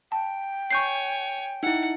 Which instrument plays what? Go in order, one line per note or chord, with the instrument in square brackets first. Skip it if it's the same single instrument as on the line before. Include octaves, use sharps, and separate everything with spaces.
[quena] G5 [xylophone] A5
[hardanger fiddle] C#5 G#5 [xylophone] C#6 G6 C7
[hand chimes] D#4 E4 [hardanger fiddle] F#5